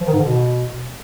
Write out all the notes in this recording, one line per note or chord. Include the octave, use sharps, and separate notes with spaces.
F3
D#3
G#2
D3
B2